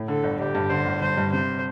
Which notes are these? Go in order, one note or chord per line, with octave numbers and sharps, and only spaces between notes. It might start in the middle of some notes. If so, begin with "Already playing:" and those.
Already playing: A2
D3 A4
G1
G1 G4
G2
D3 C5
G1
G1 C5
G2
C3 C5